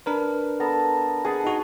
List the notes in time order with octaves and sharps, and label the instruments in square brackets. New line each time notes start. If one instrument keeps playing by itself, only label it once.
[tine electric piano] D4 A#4 B4
[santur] B3 A4 A#5
G#4 F#5 A5
[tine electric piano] D#4 F#4